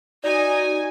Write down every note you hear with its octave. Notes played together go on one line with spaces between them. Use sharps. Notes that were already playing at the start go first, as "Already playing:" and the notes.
D#4 F#4 D5 G#5